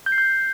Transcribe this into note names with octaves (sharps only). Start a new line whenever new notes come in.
G6
C7
G6